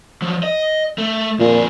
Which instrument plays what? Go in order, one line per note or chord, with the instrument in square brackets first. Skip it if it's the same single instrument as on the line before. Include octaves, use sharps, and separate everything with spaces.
[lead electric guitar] F3 F#3
D#5
A3
[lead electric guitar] F2 G#4 [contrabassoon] A#2